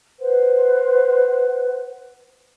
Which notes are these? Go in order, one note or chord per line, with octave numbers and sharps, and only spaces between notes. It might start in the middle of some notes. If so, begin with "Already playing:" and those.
B4 C5 F#5